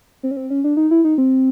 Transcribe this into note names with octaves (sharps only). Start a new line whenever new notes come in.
C4
C#4
C4
C#4
D4
D#4
E4
D#4
C4